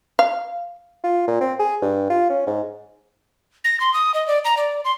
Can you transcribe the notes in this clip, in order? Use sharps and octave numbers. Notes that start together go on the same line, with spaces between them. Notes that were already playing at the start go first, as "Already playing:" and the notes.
F5
F4
A#2
C4
G#4
G2
F4
C#4
G#2
A#6
C6
D#6
D#5
D5
A#5
D5
C6